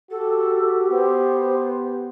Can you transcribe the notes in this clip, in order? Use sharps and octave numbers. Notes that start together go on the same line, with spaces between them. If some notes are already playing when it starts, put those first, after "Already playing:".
F#4 G4 A4
B3 C5